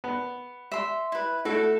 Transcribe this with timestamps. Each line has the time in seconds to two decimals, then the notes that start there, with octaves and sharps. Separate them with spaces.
0.04 B3
0.72 E5 C6
1.12 E4 B4
1.45 A3 E4 F#4